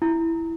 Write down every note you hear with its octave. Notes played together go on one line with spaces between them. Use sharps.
E4